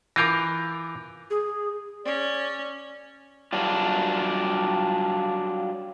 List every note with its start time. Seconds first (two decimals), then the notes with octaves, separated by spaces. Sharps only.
0.16 E3 F4 A#4 D6 G6 A#6
1.30 G#4
2.05 C#4 D5
3.53 F#3 G3 D4 F4